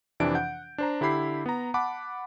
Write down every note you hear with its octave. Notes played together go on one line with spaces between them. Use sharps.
F2 C3 E3 D4 D7
F#5 G6
D4 C5 A#5
D3 E4 G4 B5 C7
B3 A#5
F#5 A5 B5 D6